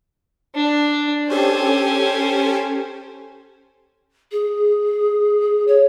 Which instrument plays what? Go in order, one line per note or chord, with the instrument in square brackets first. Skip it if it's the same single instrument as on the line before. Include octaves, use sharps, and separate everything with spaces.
[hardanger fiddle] D4
[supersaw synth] C#4 G4 A4 [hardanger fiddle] C5 G#5
[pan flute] G#4
C#5